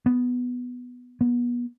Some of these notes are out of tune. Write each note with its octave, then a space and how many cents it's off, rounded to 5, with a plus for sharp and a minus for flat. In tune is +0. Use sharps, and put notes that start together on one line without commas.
B3 +0
B3 -30